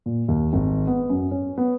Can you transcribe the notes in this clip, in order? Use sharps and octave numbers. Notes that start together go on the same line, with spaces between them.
A#2
D#2
G#1
B3
F#2
C#4
B3